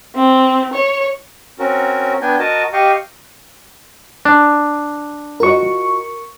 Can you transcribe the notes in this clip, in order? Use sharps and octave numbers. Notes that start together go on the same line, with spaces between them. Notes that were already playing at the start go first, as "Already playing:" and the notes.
C4
C#5
C4 C#4 F#4 A#4
B3 D4 G5 G#5
F#4 A#4 D#5 A5
G4 D#5 F5 G5 C#6
D4
F4 F#4 A#4 D#5 C#6